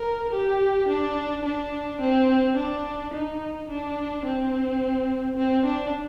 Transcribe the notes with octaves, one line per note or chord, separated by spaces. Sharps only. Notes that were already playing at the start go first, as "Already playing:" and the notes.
Already playing: A#4
G4
D4
D4
C4
D4
D#4
D4
C4
C4
D4